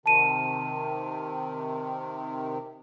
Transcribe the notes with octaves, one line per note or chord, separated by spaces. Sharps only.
C3 D#3 A5 D#7